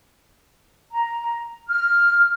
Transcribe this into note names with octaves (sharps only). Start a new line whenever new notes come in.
A#5
F6